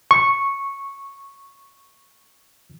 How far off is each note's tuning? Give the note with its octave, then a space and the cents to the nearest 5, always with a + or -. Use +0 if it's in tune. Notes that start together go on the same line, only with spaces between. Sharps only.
C#6 -5